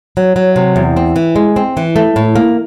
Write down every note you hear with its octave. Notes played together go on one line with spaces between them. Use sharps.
F#3
F#3
C3
E2
C4
E3
G#3
C4
E3
A3
A2
A#3